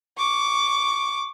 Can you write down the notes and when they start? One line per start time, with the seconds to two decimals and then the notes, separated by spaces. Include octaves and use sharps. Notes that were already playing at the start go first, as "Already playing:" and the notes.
0.17 C#6 D6